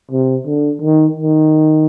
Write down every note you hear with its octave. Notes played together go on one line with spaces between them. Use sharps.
C3
D3
D#3
D#3